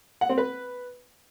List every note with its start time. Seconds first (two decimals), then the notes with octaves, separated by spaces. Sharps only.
0.21 F#5
0.29 C4
0.38 B4